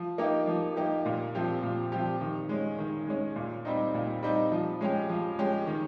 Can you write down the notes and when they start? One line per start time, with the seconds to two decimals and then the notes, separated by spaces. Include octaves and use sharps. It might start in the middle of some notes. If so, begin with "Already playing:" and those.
Already playing: F3
0.18 A#3 D#4 G4
0.47 F3
0.77 A#3 D#4 G4
1.06 A#2
1.35 F3 C4 G4
1.63 A#2
1.92 F3 C4 G4
2.21 D#3
2.49 G#3 C#4
2.79 D#3
3.07 G#3 C#4
3.36 A#2
3.65 G3 C4 D#4
3.94 A#2
4.23 G3 C4 D#4
4.52 F3
4.81 G#3 C#4 G4
5.09 F3
5.38 G#3 C#4 G4
5.67 D#3